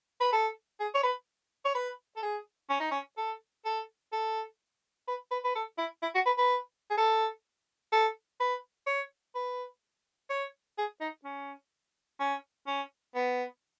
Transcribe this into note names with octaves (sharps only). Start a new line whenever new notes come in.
B4
A4
G#4
C#5
B4
C#5
B4
A4
G#4
C#4
D#4
C#4
A4
A4
A4
B4
B4
B4
A4
E4
E4
F#4
B4
B4
G#4
A4
A4
B4
C#5
B4
C#5
G#4
D#4
C#4
C#4
C#4
B3